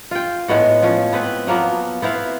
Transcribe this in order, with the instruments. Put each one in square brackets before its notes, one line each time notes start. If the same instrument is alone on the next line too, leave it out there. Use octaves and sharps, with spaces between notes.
[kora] F4 G5
A2 G#3 B3 F#4
F3 C#4
B3 C4 B4
F3 F#3 A#3 B3
B3 C4 E4 F5